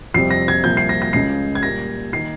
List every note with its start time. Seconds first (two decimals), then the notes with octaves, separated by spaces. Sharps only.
0.14 F2 C3 G3 C4 C7
0.31 A#6
0.48 G#6
0.64 C2 A#2 F3 G6
0.77 C7
0.89 A#6
1.02 A#6
1.13 C#2 C#3 G#3 C7
1.55 G#6
1.63 A#2 G3 A#3 A#6
2.13 D#3 A#3 C7